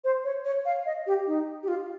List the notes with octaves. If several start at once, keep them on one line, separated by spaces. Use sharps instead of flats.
C5
C#5
C#5
F5
D#5
G4
D#4
G4
F4